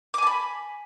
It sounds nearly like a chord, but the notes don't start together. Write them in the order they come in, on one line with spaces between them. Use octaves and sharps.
D6 G#5 A5 B5